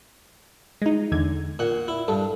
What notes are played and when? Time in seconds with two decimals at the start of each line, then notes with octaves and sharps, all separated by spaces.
0.82 G#3 D#4
1.12 E2 D3 G#6
1.59 A#2 F#5
1.88 E4
2.08 G2 A4